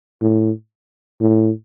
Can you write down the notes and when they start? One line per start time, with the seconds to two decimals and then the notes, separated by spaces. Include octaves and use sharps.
0.22 A2
1.21 A2